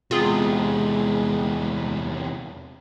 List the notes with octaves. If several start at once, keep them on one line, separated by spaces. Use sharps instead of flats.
E2 C3 G#3 F4 G#4